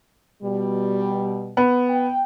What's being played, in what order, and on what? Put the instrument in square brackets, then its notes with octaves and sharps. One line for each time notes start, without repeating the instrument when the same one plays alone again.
[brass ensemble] B2 G3
[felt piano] B3
[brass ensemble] G5